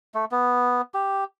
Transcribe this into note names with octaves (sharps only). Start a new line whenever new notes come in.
A3
B3
G4